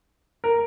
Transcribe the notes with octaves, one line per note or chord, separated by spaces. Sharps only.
A#4